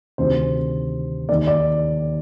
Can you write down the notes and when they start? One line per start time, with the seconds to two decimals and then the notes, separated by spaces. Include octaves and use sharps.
0.18 D2 C3 D#3 C5
1.29 D#2 D5
1.32 D#3
1.47 D5